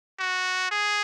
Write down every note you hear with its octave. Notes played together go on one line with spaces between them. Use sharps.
F#4
G#4